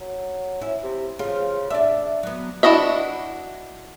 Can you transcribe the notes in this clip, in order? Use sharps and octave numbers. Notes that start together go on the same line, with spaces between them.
F#3
C#4 E4
C3
C#3 F3 F4
D4 D5 E5
F#3 B3
D4 E4 F#4 D#5 E5